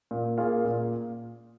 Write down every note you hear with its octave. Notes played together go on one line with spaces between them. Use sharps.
A#2
A#3 F4 G#4 F5
A#2